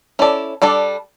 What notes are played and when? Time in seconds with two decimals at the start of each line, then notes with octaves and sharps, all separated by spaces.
0.19 C#4 E4 A4 D5
0.62 G3 D4 A4 D5